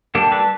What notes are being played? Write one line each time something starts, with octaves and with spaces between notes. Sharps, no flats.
G3 A#3 D4 G4 A4
A4 B4